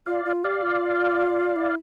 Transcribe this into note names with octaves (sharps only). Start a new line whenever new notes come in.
F4 D5 F5
F4
G4 D5 F5
F4
E4